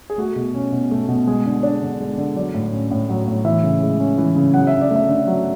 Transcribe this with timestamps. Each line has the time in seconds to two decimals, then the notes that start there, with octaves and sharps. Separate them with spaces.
0.10 G#4
0.18 A3 F#4
0.36 B2
0.55 C#4
0.72 B2
0.91 A3
1.08 B2
1.27 G#3 G#4
1.46 D3
1.63 D4
1.82 D3
2.00 G#3
2.18 D3
2.36 F#3 D5
2.54 A2
2.73 C#4
2.91 A2
3.09 F#3
3.28 A2
3.45 E3 E5
3.63 C#3
3.82 G#3
4.00 C#4
4.18 E3
4.36 C#3
4.54 F#3 F#5
4.67 E5
4.73 D3
4.81 D5
4.91 A3 E5
5.09 D3
5.27 F#3